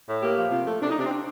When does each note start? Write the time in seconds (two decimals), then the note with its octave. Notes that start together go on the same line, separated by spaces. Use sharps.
0.09 A2
0.22 A#3 G4
0.37 F3
0.51 C3 F4
0.66 A3
0.81 C3 D4
0.90 D#4
0.96 C3 D4
1.05 C4
1.11 D4